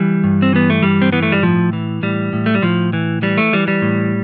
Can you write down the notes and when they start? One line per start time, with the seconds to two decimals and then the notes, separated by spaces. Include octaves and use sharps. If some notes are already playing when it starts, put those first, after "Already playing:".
Already playing: E3 G3
0.24 G2
0.42 C4
0.53 E3 B3
0.70 A3
0.83 G2 G3
1.02 C4
1.12 E3 B3
1.23 A3
1.32 G3
1.43 A2 F3
1.73 E3
2.03 A2 G3
2.33 A2
2.46 A3
2.55 G3
2.62 A2 F3
2.93 E3
3.22 E3 G3
3.38 A3
3.53 E3 G3
3.68 G3
3.82 A2